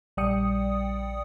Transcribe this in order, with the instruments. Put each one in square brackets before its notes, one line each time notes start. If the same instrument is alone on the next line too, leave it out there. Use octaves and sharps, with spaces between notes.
[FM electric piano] A#1 G3 D5 G5 D#6 C#7